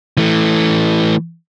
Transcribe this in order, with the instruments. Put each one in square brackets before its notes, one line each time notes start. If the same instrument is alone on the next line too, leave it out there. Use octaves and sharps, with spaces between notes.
[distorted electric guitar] E3 A3